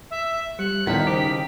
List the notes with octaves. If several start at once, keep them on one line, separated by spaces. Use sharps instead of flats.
E5
G3 G4 F#6 C#7
E2 D#3 F3 B6
C#3 G4 C5